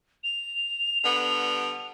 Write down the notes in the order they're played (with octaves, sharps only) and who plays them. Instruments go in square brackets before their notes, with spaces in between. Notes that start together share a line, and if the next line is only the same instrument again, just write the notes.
[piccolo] F7
[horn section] D3 G3 B3